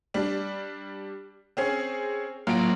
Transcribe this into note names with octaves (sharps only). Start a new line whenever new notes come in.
G3 D4
C4 C#4 G#4
A1 F#3 A#3 F4 D7